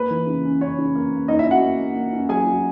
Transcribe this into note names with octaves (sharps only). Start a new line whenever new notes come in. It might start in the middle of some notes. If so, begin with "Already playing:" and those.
Already playing: A#3 B4
E3
C#3
C#4
C#3 C#5
C#3
A#3
A#3
A#3 D#4 D#5
E4 E5
C#4
F#4 F#5
A#3
A#3
A#3
C#4
F#3 G#4 G#5
F#3